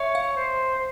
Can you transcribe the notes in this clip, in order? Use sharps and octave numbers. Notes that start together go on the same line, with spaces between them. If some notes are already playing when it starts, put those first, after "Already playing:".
Already playing: C#5 E5
F5
C5